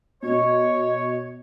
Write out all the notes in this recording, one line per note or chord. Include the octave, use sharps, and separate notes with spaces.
B2 C#5 D#5